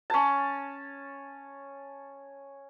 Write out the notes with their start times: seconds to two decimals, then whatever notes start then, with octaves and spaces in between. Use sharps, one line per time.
0.10 C#4 A5